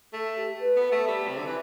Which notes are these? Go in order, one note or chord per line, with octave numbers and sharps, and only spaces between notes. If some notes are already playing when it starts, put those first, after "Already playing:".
A3 A4
G4
B4
B3
A3
G3
C3
D3
E3